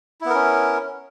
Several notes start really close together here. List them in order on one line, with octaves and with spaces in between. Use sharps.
E4 B3 A#4 C#4